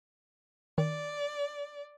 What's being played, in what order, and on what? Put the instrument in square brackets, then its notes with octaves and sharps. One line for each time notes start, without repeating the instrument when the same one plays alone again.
[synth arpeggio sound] D#3 [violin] D5